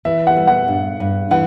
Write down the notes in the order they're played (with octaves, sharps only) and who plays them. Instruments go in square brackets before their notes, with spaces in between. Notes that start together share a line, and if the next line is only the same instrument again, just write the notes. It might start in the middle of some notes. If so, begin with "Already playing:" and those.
[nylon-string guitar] E3 [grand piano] E5
[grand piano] F#5
[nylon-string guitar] G3
[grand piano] F#5
[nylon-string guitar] G2
G2
[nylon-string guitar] E3 [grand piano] F#5